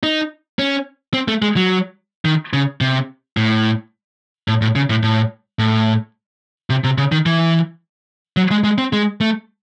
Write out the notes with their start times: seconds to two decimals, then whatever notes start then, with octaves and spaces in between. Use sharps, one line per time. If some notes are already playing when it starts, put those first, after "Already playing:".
0.03 D#4
0.59 C#4
1.14 C4
1.28 A3
1.42 G#3
1.56 F#3
2.25 D#3
2.53 C#3
2.81 C3
3.37 A2
4.48 A2
4.62 A2
4.76 C#3
4.90 A2
5.03 A2
5.59 A2
6.70 C3
6.84 C3
6.98 C#3
7.12 D#3
7.26 E3
8.37 F#3
8.51 G#3
8.64 G#3
8.78 C4
8.93 G#3
9.21 A3